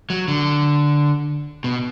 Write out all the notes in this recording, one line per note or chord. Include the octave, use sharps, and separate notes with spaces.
F#3
D3
B2